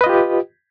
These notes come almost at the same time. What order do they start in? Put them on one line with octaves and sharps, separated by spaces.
B4 D#5 F4 G4